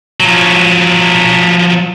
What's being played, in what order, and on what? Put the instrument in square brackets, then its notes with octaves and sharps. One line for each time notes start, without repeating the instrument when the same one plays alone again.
[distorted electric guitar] F3 F#3